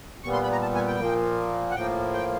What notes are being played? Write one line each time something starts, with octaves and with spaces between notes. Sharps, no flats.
A#2 G3 B3 C#6
C6
B5
A#5
A5
G#5
G5
A#2 F3 A#3
F#5
A2 F3 A#3 G5
G5